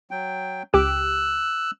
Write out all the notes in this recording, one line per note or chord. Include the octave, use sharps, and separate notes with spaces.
F#3 G5
C#2 G4 D6 E6 F#6